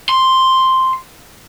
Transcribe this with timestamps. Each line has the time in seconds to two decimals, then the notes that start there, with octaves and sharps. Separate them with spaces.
0.09 C6